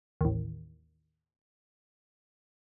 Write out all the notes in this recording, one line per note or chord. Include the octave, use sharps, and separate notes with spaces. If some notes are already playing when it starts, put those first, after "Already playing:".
A1 D#2